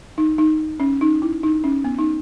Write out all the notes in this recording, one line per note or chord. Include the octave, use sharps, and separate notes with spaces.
D#4
D#4
C#4
D#4
E4
D#4
C#4
B3
D#4